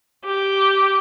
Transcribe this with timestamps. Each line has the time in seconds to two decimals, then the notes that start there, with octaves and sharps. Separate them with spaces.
0.24 G4